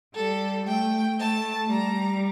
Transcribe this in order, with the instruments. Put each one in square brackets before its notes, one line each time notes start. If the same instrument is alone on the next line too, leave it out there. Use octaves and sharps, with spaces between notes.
[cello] G3 [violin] A4
[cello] A3 [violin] G5
[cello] A3 [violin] A5
[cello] G3 [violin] A#5